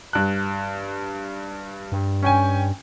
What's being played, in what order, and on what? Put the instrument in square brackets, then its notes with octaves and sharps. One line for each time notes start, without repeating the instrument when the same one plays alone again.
[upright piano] G2 F#6
[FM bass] G2
[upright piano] C#4 G5 G#5